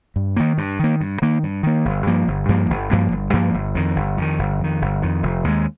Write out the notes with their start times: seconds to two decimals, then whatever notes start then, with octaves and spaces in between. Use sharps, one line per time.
0.16 G2
0.37 D#3 A#3
0.58 G2
0.79 D#3 A#3
1.01 G2
1.22 D#3 A#3
1.43 G2
1.63 D#3 A#3
1.85 G1
2.06 G2 F3 A#3
2.28 G1
2.49 G2 F3 A#3
2.70 G1
2.91 G2 F3 A#3
3.12 G1
3.33 G2 F3 A#3
3.54 G1
3.75 F2 D#3
3.96 G1
4.17 F2 D#3
4.39 G1
4.59 F2 D#3
4.82 G1
5.02 F2 D#3
5.23 F1
5.44 D#2 D3 G#3